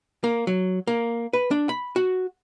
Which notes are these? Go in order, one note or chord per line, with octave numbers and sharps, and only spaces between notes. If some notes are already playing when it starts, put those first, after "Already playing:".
A#3
F#3
A#3
B4
D4
B5
F#4